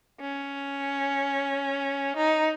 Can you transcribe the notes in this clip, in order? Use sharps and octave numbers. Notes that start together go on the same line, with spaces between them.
C#4
D#4